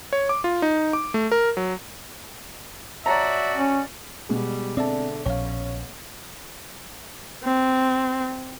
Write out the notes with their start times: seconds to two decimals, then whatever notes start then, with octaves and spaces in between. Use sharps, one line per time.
0.13 C#5
0.29 D6
0.44 F4
0.62 D#4
0.93 D6
1.14 A3
1.32 A#4
1.57 F#3
3.06 F#4 C#5 D5 E5 A5 A#5
3.56 C#4
4.29 B2 G3 G#3
4.77 D3 C4 D5 E5 A5
5.26 A#1 C#4 C#5 F5
7.43 C4